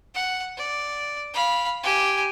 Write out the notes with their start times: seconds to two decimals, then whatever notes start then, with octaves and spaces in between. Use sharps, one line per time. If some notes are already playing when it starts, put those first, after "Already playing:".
0.15 F#5
0.57 D5
1.33 F5 B5
1.84 G4 G#5